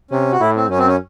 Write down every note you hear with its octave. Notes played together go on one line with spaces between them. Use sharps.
C3 C#4
F#4
A2 E4
C4
F#2 C#4
C4
C#4